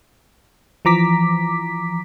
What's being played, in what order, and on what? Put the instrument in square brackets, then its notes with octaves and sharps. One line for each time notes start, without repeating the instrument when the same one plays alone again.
[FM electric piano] E3 F3 A#5 D6 B6